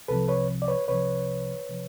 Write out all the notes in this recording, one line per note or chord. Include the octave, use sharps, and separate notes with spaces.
C2 C3 F3 A4 B4
B4 C#5
D5
B4 C#5
C2 C3 F3 B4 C#5
C3 F3